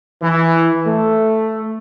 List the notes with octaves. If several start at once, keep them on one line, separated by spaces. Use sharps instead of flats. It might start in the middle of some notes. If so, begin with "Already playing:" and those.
E3
A3